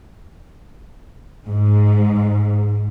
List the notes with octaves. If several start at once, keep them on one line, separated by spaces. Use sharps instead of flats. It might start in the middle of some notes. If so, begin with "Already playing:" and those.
G#2